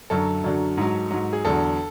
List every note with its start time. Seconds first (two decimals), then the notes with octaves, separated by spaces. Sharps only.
0.10 F#2 D3 F#3 A4
0.44 F#2 D3 F#3
0.77 G#2 F#3
1.11 G#2 F#3
1.33 G#4
1.45 E2 D3 F#3 A4